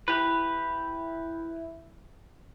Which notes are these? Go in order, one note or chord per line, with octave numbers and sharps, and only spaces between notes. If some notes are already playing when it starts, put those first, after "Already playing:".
E4 G4 B4